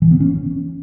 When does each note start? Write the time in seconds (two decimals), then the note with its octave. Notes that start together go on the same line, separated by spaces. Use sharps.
0.02 E3
0.11 B3
0.20 C#4